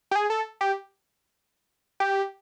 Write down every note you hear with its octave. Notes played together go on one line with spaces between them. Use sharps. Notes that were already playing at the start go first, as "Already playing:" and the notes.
G4
G#4
A4
G4
G4